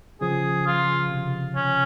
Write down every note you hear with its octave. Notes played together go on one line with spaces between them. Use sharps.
C#3 F3 G#4
F4
C3
C#4